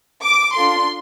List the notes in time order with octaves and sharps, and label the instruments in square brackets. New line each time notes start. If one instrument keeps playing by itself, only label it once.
[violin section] D6
D4 F4 A4 C6